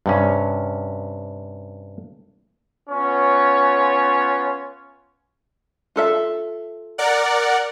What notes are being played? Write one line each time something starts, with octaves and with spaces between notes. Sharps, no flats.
G2 C3 C#4
B3 C#4 F4 C#5
F4 A4 E5
A#4 D5 F#5